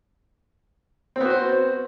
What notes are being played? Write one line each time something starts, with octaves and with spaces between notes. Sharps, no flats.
B3 C4 F#4 C5